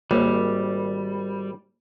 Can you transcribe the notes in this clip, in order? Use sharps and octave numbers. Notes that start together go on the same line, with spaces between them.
G#1 G3 A#3 C#5